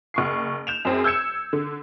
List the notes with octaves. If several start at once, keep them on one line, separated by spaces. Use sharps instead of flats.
F#1 C#6 C7
G6 E7 F7
F#2 C4 G#4
E6 G6 G#6 C#7 E7
D3